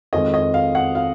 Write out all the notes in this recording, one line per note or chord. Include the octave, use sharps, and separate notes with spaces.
F2 D#3 G#3 D#5
D#5
F5
F#5
F5